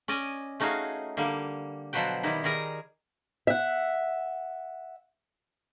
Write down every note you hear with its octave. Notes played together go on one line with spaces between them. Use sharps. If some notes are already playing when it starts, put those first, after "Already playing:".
C#4 D5 D#5 G#5
A3 C#4 D#4 F#4 G#4 F5
D3 G3 A#3
B2 F3 F#3 B4 G5
D#3 G3 D#4 E4
D#3 G3 G#4 A#4 A#5
E5 F#5